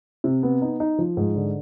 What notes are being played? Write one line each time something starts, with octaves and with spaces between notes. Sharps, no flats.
C3
B3
D#4
D#4
F3
G#2
D3